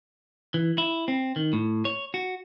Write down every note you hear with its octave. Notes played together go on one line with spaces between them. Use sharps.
E3
E4
C4
D#3
A2
C#5
F#4